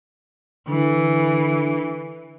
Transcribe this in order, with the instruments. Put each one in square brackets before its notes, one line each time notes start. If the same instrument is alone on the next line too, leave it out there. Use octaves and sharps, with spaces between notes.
[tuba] D3 [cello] E3